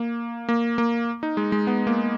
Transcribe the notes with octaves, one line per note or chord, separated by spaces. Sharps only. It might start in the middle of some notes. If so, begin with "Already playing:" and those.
Already playing: A#3
A#3
A#3
D#4
G#3
G#3
B3
A#3